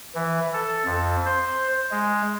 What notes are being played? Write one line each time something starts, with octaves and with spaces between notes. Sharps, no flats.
E3
A4
F2
C5
G#3